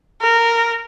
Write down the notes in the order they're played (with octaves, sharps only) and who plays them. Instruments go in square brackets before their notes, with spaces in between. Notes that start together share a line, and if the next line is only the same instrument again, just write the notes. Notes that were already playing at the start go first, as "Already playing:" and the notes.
[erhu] A#4